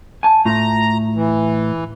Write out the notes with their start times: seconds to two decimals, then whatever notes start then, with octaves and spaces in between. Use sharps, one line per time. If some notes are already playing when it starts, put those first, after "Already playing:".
0.23 G#5 A5
0.45 A2 F4 A#5
1.16 E3